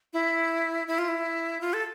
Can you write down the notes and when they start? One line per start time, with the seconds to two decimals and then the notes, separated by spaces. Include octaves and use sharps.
0.13 E4
0.88 E4
0.98 F4
1.08 E4
1.61 F4
1.73 A4